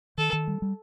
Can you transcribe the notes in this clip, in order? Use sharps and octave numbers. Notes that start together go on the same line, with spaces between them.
D#3 A4
D#3
G3
G3